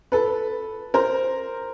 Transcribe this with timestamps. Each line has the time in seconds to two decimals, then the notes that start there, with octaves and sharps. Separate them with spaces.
0.12 A4 B4
0.94 A#4 C5